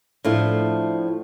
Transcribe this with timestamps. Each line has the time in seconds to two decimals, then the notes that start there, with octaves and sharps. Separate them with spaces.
0.25 A2 F3 A3 D4